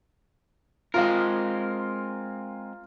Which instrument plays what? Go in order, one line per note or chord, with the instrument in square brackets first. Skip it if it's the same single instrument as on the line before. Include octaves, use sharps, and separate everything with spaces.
[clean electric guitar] G#3 C4 A#4 [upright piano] F4 F5